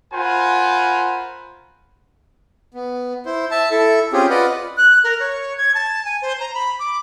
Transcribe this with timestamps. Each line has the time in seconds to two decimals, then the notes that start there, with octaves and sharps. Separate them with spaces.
0.13 F4 A#4 C5 F#5 G#5 B5
2.74 B3
3.26 E4 C5
3.51 E5 A5
3.71 E4 A4 E5
4.13 C4 C#4 F4 G4 G#4
4.30 F4 B4 D5 D#5 F#5
4.77 F#6
5.04 A#4
5.20 C#5
5.57 G#6
5.75 A5
6.05 G#5
6.22 C5
6.40 A#5
6.54 B5
6.79 D6